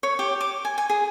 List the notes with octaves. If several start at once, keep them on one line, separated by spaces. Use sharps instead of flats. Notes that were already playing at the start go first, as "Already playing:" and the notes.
C#5
G4
D6
G#5
G#5
G#4